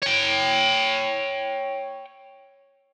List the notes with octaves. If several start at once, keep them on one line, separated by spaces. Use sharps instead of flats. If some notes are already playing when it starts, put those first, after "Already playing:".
C#5 G5